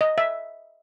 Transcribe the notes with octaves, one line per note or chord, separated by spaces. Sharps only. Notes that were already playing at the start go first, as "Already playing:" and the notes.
D#5
E5